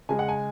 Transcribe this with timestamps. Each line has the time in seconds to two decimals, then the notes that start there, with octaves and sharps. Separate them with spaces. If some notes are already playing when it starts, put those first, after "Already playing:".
0.09 C#3 G#3 G#5
0.19 F#5
0.29 G#5